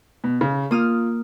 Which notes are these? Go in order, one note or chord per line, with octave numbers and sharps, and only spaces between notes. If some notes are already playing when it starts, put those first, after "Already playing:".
B2
C#3
A#3 F4 D#6 F6